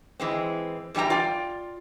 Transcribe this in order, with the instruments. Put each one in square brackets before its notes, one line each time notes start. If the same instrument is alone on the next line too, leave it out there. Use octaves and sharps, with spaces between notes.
[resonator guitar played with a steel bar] E3 G#3 C4
E2 G3 D#4 G5 A#5
F4 D5 G5